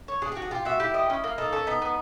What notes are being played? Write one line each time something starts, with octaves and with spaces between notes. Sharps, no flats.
C#5
D4 G#4
F#4 G4
G#4
F4 G4
F#4 E5
E4 G4
D#5
C#4
A#3
D#4 A4
C#4 A4
B3 D#4
B3